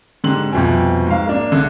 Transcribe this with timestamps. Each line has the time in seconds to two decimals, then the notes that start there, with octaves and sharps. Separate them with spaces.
0.24 G#2 D3 G4 C6 F#7
0.52 C2 F2 B2 F3 C4 G#5
1.07 G#2 F5
1.27 A#3 D4
1.52 C2 D3